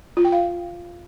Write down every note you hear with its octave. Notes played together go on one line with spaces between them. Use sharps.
F4
G5
F5